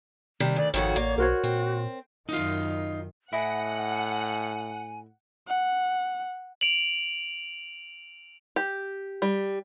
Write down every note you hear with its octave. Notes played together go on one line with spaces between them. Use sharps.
C3 D#3 G3
D2 D5
G#1 F2 D#3 F#4 C#5
A1 A#3 D5
B1 F#4 A#4 C5 C#5
A#2 C4
F#2 D#3 D#4 F4
A2 E4 D#5 F#5 G#5
F#5
D7 F7 F#7
G4
G3